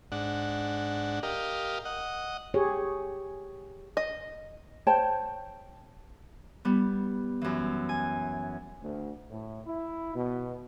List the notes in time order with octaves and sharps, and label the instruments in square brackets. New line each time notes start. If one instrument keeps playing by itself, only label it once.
[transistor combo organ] G#2 D4 F#5
G4 A#4 D#5 F5
D#5 F#5
[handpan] G4 G#4 C#5
[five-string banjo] D#5
[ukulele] C5 C#5 G5 A5
[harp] G3 B3
F#2 E3
G#5
[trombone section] D2
A2
E4
B2